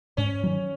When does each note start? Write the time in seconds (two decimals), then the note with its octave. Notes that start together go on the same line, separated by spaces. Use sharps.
0.17 G#2 C#4
0.43 D#3 F#3